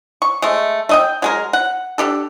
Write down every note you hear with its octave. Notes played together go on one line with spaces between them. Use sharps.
C#6
G#3 A3
A3 D#5 G5
F#3 G#3 A#4
F#5
D4 G4 A4